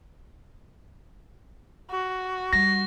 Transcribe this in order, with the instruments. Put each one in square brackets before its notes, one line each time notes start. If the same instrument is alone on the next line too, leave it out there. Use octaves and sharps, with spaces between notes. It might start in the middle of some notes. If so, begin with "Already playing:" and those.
[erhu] F#4
[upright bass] G3 [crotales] A#6